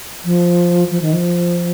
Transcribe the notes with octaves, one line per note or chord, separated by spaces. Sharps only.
F3
F3
D#3
F3